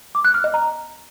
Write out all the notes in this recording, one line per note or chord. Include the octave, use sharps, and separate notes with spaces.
D6
F#6
F6
D#5
A#5